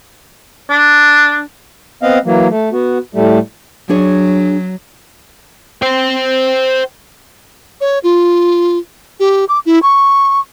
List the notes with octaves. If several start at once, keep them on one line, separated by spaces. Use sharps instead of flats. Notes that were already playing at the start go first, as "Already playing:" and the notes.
D4
B3 C4 D#5 F5 F#5
E3 F#3 A#3
A3
B3 F#4
A2 G3 A3
F#3 D4 G#4 C#5
C5 G5
C#5
F4
G4
D6
E4
C#6